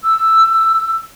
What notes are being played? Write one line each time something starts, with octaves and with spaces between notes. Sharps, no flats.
E6